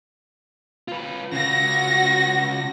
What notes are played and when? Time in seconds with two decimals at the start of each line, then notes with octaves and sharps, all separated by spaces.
0.88 F4 B4
1.33 C#3 F4 F#4 A#6